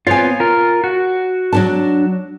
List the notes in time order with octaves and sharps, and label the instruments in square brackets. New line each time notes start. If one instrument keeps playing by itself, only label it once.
[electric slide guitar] B3 C4 F4 [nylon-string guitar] C#5 G#5
[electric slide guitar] F4 A#4
F#4
[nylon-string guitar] F#3 D4 A5